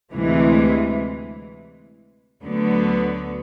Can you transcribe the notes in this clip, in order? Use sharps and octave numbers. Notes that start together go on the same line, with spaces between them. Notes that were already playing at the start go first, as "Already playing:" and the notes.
D2 C3 E3 G#3
D2 D3 F#3 B3